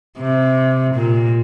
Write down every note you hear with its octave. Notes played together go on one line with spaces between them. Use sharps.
C3
A#2